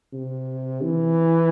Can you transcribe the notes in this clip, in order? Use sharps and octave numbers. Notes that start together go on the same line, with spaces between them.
C3
E3